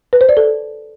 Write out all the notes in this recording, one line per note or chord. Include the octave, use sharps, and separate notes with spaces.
B4
C5
D5
A4